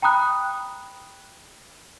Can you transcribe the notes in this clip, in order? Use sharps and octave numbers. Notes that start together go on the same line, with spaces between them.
G5 A#5 B5 D#6 F#6